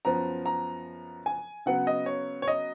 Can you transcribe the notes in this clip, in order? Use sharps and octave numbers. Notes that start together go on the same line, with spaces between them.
F#2 F3 B3 A#5
A#5
G#5
C#3 F#3 B3 F#5
D#5
C#5
C#5
D#5